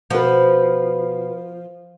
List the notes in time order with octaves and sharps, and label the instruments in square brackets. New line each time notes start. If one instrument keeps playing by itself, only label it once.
[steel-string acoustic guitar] B2 B4 [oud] F3